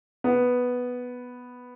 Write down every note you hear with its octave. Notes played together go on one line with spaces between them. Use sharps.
B3